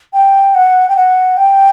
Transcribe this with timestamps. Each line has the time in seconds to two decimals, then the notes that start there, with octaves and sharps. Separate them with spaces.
0.13 G5
0.55 F#5
0.89 G5
0.96 F#5
1.37 G5